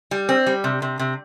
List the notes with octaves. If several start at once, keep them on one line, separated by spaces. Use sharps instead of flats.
G3
C4
G3
C3
C3
C3